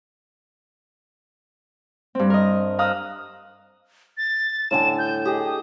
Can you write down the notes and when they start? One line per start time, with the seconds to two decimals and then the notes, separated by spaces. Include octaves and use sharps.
2.15 G2 C4
2.30 A#4 D#5
2.79 F5 A#5 D#6 E6 F#6
4.17 A6
4.71 A2 D3 G#5 E7
4.98 G6
5.25 G4 G#4 D#5 D#6